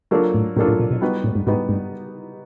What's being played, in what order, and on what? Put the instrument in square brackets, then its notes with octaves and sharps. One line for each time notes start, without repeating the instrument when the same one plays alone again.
[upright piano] F#3 A#3 D4 F4 A4
[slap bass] A2
[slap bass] A2 [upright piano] F#3 A#3 D4 F4 A4
[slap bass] A2
A#2
B2
[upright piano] G3 B3 D#4 F#4 B4
[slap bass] A2
G2
[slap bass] G#2 [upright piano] G3 B3 D#4 F#4 B4
[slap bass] G2